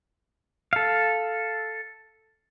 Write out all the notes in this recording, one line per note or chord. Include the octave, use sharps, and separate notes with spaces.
A4 F5